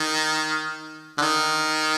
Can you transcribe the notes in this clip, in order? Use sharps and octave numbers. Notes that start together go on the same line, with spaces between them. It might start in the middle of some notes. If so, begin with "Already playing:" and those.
Already playing: D#3
D3
D#3